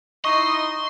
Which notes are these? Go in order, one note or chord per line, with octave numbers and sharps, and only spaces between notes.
D#4 E4 D#5 C6 C#6